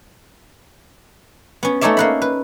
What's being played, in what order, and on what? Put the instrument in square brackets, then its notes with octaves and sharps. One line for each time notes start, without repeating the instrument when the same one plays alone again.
[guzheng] B3 C#4
A3 C#4 D#4 C#5 D5 E5
A#3 F#5 B5
B4